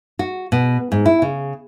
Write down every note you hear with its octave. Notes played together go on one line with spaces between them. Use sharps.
F#4
B2
G#2
E4
C#3